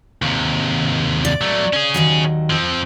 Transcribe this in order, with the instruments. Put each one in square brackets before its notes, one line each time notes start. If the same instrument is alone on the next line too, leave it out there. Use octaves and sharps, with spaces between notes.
[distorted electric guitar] D#2 C3
[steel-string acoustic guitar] D5
[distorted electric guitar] F#3 A3
C#4 G#4
[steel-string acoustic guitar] D#2 D#3 F#3
[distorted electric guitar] F3 C4